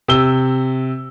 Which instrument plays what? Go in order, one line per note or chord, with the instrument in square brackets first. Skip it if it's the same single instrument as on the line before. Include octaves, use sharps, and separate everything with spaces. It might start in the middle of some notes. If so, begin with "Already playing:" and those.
[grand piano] C3 E6 G7